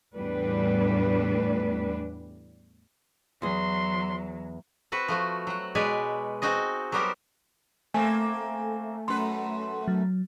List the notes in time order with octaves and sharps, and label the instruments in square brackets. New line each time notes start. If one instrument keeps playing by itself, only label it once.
[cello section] E2 A2 G3 D4 B4
[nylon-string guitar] E2 G#4 [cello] F#3 [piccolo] C6
[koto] C4 F#4 B4 F#5
F3 A3 F#4
F#3 F#5
B2 G#3 B4 C#5 D5 G#5
C4 D#4 F#4 G#4 D#5
F#3 G3 B3 G4 A#4 C5
[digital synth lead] A3 [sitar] A#3 C4 [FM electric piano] G#5
[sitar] F#2 B4 [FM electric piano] C6
[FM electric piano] F#3